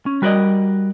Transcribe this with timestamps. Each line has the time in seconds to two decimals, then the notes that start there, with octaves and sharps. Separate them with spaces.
0.06 C#4
0.22 G3 F#4 A#4 B4 D5 D#5